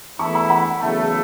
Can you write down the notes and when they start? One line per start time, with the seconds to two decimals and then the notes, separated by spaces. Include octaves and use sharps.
0.19 E2 E3 A3 E4 A5 C#6
0.35 B5 E6
0.50 F#5 B5
0.65 F#5
0.80 E2 C#3 F#3 A3 E5 A5